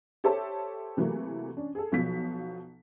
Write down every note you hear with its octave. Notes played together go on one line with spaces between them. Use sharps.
G4 A4 C5 C#5 E5 A5
C3 E3 F#3 A3 A#3
C#4 D4
G#4 A4
B1 B2 F3 F#3 B6